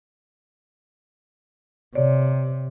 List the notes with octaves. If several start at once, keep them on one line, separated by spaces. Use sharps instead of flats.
C3 C#5 D5